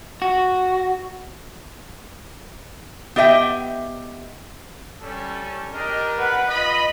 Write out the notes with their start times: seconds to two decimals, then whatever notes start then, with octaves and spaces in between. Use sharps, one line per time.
0.22 F#4
3.16 B3 G4 D#5 E5 G5
5.02 G3 C#4 A4
5.73 D4 G4 A#4 D#5
6.19 B4 F#5 B5
6.50 F4 B4 D#5 B5